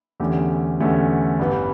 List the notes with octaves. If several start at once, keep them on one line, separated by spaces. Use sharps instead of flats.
E2 D3 A3 C#4 G4
E2 D3 A3 C#4 G4
A1 G2 E3 G3 B3